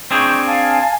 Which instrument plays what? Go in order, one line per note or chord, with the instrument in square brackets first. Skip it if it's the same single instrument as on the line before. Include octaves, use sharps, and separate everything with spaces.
[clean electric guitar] C4 D4 G#4 [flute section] C#6 G6
[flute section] F5 G#5 A5